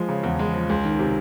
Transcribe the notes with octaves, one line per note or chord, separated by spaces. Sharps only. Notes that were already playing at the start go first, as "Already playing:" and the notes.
Already playing: F3 G#3
C#3
E2
G#3
F3
C#2
D#3
C3